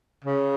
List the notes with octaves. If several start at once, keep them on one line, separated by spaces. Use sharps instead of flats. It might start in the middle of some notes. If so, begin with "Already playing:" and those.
C#3